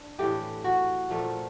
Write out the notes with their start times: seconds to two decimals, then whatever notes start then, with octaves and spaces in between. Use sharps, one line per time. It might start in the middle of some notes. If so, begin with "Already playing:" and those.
Already playing: D4
0.19 A2 E3 A3 G4
0.64 F#4
1.10 A#2 F3 A3